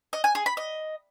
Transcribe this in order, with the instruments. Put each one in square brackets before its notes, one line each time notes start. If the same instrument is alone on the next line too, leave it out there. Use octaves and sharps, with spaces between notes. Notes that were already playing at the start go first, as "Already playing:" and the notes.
[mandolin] D#5
G#5
G#4
B5
D#5